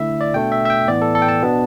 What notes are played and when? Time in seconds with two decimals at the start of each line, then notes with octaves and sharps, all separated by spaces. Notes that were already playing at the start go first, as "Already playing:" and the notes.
Already playing: D3 A3 E4 E5
0.21 D5
0.34 B2 A3 D4 G5
0.52 E5
0.65 E5
0.70 G5
0.88 A2 E3 B3 D5
1.02 A4
1.15 A4
1.22 G5
1.28 A5
1.43 B2 B3 D4